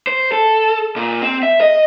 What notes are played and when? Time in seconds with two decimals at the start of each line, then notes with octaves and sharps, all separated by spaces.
0.07 C5
0.32 A4
0.96 A#2
1.22 C4
1.43 E5
1.61 D#5